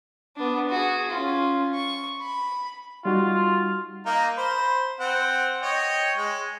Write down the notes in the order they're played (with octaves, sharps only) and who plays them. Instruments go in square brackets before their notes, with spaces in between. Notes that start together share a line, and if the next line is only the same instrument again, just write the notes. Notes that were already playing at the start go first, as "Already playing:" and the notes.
[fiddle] B3 D4
F#4 G#4
C#4 F4
C#6
B5
[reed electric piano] G3 D#4 F#4 [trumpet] F4
[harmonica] A#3 D#4
C5 B5
C4 F#5
C#5 D#5 G5
G#3